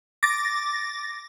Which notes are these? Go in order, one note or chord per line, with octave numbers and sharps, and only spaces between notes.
D6 A6 A#6